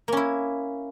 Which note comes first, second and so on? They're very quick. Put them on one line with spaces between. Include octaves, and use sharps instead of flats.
A#3 C#4 E4